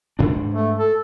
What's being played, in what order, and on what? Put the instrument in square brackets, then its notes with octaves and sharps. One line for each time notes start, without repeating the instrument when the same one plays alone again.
[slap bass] G#2 D4
[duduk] A3
A4